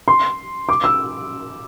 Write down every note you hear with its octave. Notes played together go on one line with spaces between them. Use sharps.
C6
D6
E6